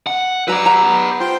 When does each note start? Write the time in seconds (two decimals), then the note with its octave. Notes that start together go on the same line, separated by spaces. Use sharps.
0.07 F#5
0.48 F#4 B4 D5 A#5 E6
0.66 A#5
0.84 B3
1.20 F4 C5 G5